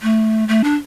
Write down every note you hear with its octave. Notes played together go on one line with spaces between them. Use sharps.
A3
A3
D4